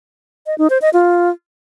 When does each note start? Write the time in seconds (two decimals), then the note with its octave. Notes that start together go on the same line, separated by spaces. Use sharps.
0.47 D#5
0.58 D#4
0.70 C5
0.82 D#5
0.93 F4